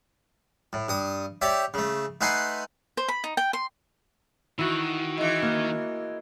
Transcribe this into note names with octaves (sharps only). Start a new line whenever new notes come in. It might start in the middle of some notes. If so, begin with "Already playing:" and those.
A2
G2 D#6
G4 C#5 D5 E5
C#3 A3
A3 D#4 B4 F#5 G#5 C6
C5
B5
D#4
G5
C6
D#3 E3 E4 F#4
E3 G#3
A#3